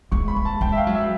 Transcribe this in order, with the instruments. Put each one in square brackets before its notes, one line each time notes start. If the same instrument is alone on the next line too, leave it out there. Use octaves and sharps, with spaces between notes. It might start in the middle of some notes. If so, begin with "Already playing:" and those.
[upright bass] G#3 [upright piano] C#6
[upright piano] B5
[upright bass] G#3
[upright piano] A5
[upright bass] G#3 [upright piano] G5
[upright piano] E5
F5
[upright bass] F#3
[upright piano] E5